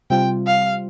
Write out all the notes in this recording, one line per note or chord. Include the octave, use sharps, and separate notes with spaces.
C3 G3 C4 F4 G5
F5